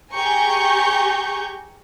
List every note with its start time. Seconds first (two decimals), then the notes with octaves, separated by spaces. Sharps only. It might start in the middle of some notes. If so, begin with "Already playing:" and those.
0.13 G4 G#4 G#5 A#5 C#6 G6